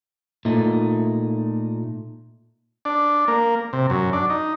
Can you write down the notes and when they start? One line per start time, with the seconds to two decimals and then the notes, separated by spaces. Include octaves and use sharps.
0.45 A#2 A3 D#4
2.85 D4
3.28 A#3
3.73 C3
3.90 F#2
4.13 D4
4.30 D#4